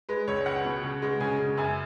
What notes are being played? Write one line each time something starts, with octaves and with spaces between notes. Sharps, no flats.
G#3 B4
C#2 C#5
C#2 F#5
B2
C#3
G#3
C#3 G#5
C#3
F#2 G#5